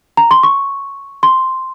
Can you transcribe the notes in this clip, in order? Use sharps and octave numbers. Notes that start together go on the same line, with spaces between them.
A#5
C6
C#6
C6